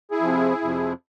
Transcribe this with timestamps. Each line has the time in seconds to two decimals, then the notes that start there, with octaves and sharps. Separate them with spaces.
0.11 E4 G#4
0.21 F2 C3 F3
0.61 F2 C3 F3